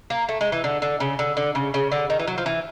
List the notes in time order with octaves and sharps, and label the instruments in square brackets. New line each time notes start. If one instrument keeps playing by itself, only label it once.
[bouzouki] A#3
A3
G#3
E3
D3
D3
C#3
D3
D3
C#3
C#3
D3
D#3
E3
F#3
F3
E3